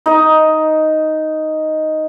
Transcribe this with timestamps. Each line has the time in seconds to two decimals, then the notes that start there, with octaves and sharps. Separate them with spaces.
0.06 D#4 D#5